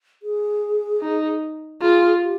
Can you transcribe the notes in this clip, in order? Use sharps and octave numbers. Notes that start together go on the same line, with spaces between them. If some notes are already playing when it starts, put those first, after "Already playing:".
G#4
D#4
F4 G#4
G4